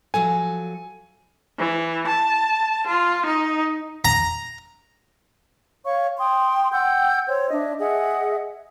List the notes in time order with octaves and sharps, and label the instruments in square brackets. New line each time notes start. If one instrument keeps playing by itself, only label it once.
[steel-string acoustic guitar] F3 F#3 A4 [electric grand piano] G#5
[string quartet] E3
A5
F4
D#4
[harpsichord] A#5
[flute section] C#5 F5 C#6
G5 C6 D#6
F#5 G5 E6 G6
C5 C#5
D4 D#5 E5
G#4 D#5 E5 F#5